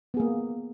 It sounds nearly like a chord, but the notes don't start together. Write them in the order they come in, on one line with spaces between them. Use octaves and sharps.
B3 G#4 A#3